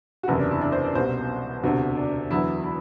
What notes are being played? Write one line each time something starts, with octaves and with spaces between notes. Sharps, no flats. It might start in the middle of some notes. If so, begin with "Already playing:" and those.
F#4
F#1 E2 C3 E4
D4
E4
D4
C5
D5
C2 B2 G3 C5
E1 D2 C3 F#4
D4
E2 D3 F#3 E4
E4